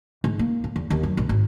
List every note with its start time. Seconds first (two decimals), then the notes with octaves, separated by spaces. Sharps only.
0.24 G#2
0.39 A#3
0.64 A2
0.76 E2
0.90 D#2
1.03 F#2
1.17 A#1
1.29 G#1